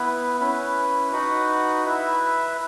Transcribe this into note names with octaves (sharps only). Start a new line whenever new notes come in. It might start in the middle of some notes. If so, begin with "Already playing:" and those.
Already playing: B3 E4 B4
C#4 E4 B4
D#4 F#4 B4 F#5
E4 B4 E5